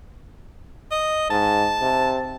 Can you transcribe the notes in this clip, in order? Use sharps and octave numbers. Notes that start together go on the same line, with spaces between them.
D#5
G#2 A5
C3